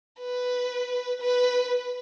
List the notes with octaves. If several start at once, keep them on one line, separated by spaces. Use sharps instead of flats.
B4
B4